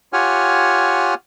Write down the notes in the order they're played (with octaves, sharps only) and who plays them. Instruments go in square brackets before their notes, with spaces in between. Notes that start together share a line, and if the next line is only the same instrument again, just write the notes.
[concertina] F4 G4 C#5 F#5 G#5 F6